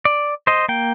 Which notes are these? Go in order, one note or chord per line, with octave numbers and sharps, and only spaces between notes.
D5
C5 D#5
A#3 G5